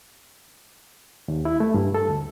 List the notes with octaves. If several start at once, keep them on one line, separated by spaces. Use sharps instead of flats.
D#2
E4
A3
G2
A4
D2